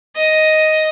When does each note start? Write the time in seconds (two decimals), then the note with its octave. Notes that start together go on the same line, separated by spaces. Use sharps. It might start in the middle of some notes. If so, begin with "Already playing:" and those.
0.16 D#5